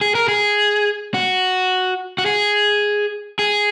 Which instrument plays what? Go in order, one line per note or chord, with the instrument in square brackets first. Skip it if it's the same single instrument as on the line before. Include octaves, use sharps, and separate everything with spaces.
[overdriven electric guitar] G#4
A#4
G#4
F#4
F#4
G#4
G#4